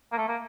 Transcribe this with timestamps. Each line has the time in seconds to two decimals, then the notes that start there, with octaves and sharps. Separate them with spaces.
0.12 A#3
0.17 A3
0.28 A#3